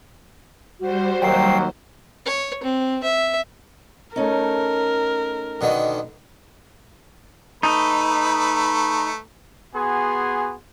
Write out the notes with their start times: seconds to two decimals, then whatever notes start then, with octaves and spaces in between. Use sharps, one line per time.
0.80 G3 F#4 C5
1.22 D#2 F#3 G5 C7
2.25 C#5
2.63 C4
3.03 E5
4.16 A3 C#4 D#4 A#4
5.61 B2 D3 D#3
7.63 A3 D#4 B4
9.75 B3 F#4 G#4 G#5 C6